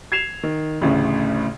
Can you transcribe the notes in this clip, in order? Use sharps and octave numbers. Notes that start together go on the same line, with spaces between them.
G#6 C7 E7 F7
D#3
A1 D2 A2 C#3